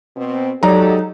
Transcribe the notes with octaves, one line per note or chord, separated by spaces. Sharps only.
B2 C4
F#3 G#3 D#4 G4 A4 D5 A#5